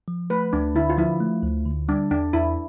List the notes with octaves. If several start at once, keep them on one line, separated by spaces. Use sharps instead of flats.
F3
A3 B4
D2 D4
D3 E4
F4
F3 E4
A3
D2
D3
G3 D4
E2 D4
E2 E4